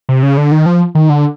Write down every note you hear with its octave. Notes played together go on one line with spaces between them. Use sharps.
C3
C#3
D3
D#3
F3
D#3
D3